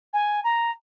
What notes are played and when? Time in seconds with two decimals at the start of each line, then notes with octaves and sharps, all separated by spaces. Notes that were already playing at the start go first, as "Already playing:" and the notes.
0.13 G#5
0.44 A#5